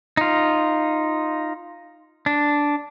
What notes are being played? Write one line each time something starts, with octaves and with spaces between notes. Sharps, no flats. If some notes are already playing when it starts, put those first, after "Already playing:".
D#4 F4
D4